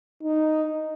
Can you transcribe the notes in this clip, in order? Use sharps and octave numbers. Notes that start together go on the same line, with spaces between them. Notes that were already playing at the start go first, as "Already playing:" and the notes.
D#4